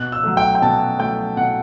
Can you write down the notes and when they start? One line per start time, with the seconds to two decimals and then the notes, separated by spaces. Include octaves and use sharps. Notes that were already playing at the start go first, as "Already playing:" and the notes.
Already playing: B2 F#6
0.12 E6
0.24 F#3 A3
0.37 G5
0.55 G5
0.62 B2 A5
0.99 F#3 A3 G5
1.37 B2 F#5